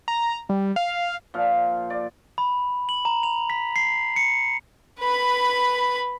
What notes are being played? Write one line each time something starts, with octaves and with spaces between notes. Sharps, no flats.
A#5
G3
F5
A#2 F3 F5
D5
B5
F#7
A#5
F7
B6
C7
C#7
B4 B5